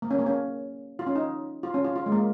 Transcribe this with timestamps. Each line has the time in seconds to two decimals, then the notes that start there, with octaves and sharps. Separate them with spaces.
0.02 A#3
0.11 C#4
0.19 A#3
0.26 C#4
0.99 F4
1.07 C#4
1.15 D#4
1.63 F4
1.74 C#4
1.85 F4
1.96 F4
2.06 G#3
2.12 A#3